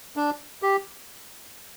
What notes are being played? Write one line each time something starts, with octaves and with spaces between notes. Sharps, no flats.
D4
G4